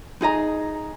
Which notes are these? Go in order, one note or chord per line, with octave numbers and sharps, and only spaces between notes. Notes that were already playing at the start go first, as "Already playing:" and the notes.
D#4 G#4 D#5 A#5